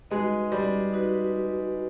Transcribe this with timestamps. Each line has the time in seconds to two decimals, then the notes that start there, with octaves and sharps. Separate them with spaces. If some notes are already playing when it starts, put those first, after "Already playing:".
0.11 G#3 D#4 F#4 B4 D#5
0.52 G3
0.93 D#4 F#4 B4 D#5